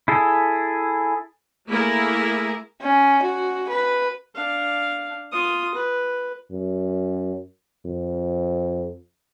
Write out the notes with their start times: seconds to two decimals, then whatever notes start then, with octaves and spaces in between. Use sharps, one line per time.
0.08 E4 G#4 A4
1.68 A3 A#3 E4 G#4 A#4
2.81 C#4
3.22 F#4
3.70 B4
4.35 D4 F5
5.32 F4 D#6
5.75 B4
6.52 F#2
7.86 F2